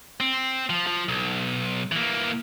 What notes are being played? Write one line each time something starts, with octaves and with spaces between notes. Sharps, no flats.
C4
F3
F3
B1
E3 A#3